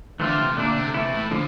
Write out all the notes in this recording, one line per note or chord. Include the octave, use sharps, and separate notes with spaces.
D3 E3 A3 C4 F4
C3
A#2 D3 A3 D4
C3
C3 E3 A3 E4
A2
A2 D3 F3